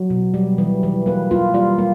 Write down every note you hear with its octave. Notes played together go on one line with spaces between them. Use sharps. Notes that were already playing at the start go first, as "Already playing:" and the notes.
Already playing: F#3
B2
G3
E3
E3
A#3 B4
A#3 F4
G3 F4
A#3